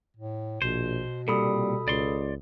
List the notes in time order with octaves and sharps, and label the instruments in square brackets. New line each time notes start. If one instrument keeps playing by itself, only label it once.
[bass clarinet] A2
[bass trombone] A#1 [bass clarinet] B2 [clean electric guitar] C5
[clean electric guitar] C2 A#2 [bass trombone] G3 [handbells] A4 B5 D#6
[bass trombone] C#2 [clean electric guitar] D5 C6